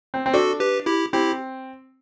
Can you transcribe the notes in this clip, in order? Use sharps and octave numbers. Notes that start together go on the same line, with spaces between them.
C4
C4
D4 F#4 A4
G4 B4
E4 G4
C4 E4 G4